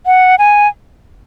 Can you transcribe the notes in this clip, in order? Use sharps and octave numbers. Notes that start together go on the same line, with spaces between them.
F#5
G#5